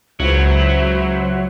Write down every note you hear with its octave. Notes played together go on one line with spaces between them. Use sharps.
C#2 F#3 E4 C5 E5